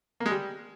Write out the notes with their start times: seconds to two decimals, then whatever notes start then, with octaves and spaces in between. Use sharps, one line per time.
0.20 A#3
0.26 G#3
0.31 G3